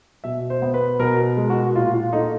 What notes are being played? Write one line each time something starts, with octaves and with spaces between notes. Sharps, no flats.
B2 E5
C5
B3
B4
B2 A#4
G#3
F#4
A#2 F4
F4
A3 D#4